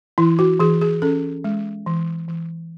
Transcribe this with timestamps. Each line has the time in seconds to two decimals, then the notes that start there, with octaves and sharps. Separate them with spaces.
0.18 E3 E4
0.39 F#4
0.60 E3 G#4
0.81 G#4
1.02 C#4 A4
1.44 G#3
1.86 E3
2.28 E3